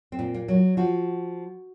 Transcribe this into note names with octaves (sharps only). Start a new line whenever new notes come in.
C4
A#2
A#3
F#3
F3 F#4